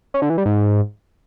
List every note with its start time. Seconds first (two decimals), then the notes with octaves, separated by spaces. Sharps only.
0.14 C#4
0.22 D3
0.30 E3
0.38 G3
0.46 G#2